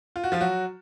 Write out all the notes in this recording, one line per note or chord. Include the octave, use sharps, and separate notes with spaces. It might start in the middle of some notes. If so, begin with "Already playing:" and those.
F4
F#4
F3 F4
F#3 F#4